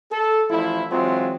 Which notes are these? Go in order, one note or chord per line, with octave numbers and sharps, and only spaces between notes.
A4
A1 F3 E4
E3 F#3 G#3 C4 F4